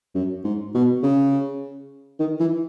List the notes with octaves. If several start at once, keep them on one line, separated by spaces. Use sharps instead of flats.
F#2
G#2
B2
C#3
D#3
E3